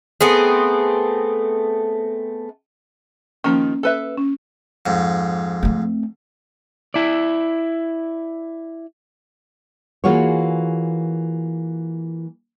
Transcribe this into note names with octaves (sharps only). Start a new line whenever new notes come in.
A3 B3 C4 G#4
D#3 F3 A#3 C#4
A4 B4 E5
C#4
F2 G#2
A3 C4
E4 D5
E3 A#3 F4 F#4 G#4 C#5